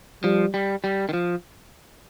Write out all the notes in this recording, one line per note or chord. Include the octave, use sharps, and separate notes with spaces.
F3 G3
G3
G3
D#3
F3